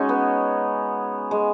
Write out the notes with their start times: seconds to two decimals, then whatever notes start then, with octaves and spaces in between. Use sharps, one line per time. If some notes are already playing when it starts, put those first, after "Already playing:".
Already playing: G#3 C#4 D#4 F#4
0.09 B3
1.31 G#3